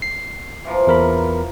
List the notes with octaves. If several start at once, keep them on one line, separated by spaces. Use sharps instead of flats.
C7
E3 F3 A#3
E2 A#4 B5